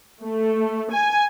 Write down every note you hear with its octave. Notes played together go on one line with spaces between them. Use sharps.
A3
G#5